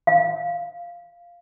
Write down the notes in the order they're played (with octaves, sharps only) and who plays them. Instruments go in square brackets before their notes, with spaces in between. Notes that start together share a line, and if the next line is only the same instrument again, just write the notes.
[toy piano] F5